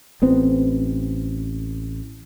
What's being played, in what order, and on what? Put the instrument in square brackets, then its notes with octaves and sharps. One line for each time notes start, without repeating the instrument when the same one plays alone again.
[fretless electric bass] A1 B3 C4